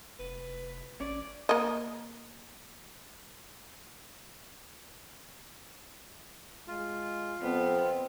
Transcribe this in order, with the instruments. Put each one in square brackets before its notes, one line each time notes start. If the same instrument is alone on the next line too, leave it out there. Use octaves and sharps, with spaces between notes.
[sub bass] F1 [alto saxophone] B4
[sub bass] A1 [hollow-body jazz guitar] C#4 [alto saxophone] D5
[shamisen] A#3 D#5
[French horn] G#3 [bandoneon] F4
[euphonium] F2 [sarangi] B3 [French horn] C4